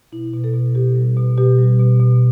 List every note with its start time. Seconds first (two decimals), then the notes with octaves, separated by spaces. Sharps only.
0.12 B2 E4
0.33 B2
0.44 A4
0.54 B2
0.75 B2 G4
0.95 G3
1.17 B2
1.38 B2 G4
1.59 G3
1.79 B2
2.00 B2